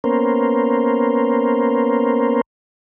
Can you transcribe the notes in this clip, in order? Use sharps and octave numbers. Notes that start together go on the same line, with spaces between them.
A#3 B3 C#4 A#4 C5